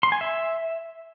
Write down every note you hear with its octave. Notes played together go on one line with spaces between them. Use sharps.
C6
G#5
E5